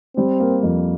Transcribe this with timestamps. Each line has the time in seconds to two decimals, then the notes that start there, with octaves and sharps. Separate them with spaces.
0.16 G3 C4
0.40 A#3
0.63 F2